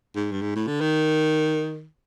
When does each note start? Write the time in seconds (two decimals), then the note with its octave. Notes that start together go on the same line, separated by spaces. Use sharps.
0.16 G#2
0.32 G2
0.42 G#2
0.56 A2
0.68 D3
0.81 D#3